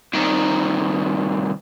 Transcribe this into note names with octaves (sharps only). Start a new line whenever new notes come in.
C2 D#3